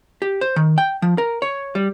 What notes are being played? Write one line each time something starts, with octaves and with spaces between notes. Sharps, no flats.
G4
C5
D#3
G5
F3
A#4
C#5
G3